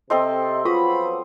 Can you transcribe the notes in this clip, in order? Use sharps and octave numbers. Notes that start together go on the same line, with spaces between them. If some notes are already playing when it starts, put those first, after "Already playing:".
C3 C4 A4 C5 D#5
F3 F#3 B3 F4 B5 D#6